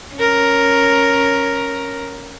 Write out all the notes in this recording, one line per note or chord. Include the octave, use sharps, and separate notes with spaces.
C#4 A#4